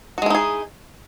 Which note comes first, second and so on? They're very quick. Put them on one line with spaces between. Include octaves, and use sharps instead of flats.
F#4 G#3 E4 D#4 G#4